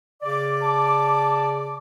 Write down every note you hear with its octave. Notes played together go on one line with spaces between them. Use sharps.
C#3 D5 D6
A5